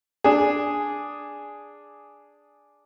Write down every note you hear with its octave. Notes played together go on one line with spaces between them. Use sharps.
D4 G#4